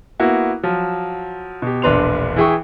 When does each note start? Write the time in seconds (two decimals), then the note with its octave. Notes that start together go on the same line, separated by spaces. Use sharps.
0.20 A#3 B3 E4 F#4
0.63 F3 F#3
1.62 B2 G4
1.82 E1 A#1 D4 B4 C6 F7
2.36 E3 E4 G#4 G5 C#6